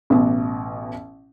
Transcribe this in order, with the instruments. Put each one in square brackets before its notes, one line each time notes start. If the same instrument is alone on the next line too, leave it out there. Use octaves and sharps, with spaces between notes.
[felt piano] A1 B2